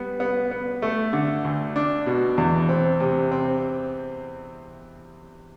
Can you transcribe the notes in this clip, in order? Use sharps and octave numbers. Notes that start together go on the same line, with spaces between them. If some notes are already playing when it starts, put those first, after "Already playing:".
Already playing: G3 B3
B3
B3
A3
D3
D2
D4
B2
E2
C4
C3
C4